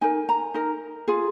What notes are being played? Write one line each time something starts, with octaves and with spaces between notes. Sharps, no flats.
D#4 A#4 G#5
A#5
D#4 A#4
F4 G#4